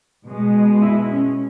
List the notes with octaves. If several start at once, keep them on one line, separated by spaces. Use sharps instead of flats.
B2 G#3
E4
C#4